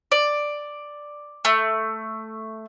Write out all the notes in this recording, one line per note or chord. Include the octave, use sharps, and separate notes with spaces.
D5
A3